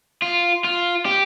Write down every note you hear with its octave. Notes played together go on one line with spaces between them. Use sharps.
F4
F4
G4